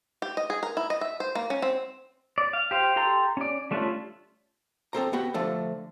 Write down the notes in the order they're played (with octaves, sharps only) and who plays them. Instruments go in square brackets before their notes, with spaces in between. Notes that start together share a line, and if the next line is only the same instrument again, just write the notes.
[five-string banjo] G4
D#5
G#4
A#4
E4
D#5
E5
C5
A#3
C#4
C4
[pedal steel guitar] D5
F5
G4 C5 F5
G4 A4 A#5 C6
C#4 D5
G3 A3 C#4 D4 F4
[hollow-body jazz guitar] C4 A4 C5 A#5
B3 F#4 G4
D3 F3 A3 A4